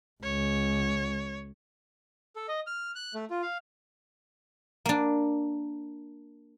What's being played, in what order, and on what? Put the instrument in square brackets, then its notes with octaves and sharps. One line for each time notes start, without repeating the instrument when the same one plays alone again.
[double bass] C#2 [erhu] C#5
[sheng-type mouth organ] A4
D#5
F6
F#6
A3
F4
F5
[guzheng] A#3 D4